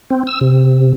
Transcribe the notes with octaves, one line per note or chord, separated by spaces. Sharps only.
C4
E6
C3